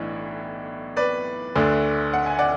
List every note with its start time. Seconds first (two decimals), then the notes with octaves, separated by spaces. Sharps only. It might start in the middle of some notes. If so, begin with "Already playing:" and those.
Already playing: B1 A2 E3 D4
0.97 B4 D5
1.56 D2 D3 A3 D4
2.13 F#5
2.26 G#5
2.39 D5 F#5